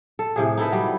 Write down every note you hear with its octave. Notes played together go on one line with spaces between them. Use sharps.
A4
A2 C3 G#4
D#4 E4 A4 B4
F#3 G3